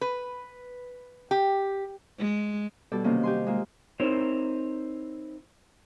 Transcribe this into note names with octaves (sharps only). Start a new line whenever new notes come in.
B4
G4
G#3
B2 G3 A4 D5
C3 D#3 F#3 A#3 C#4
G4 G#5 C6
G#3 A#3 F4
C4 D#4 E4 A#4 C5 C#5